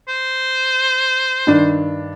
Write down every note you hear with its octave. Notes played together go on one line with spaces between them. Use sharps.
C5
G2 D#3 D4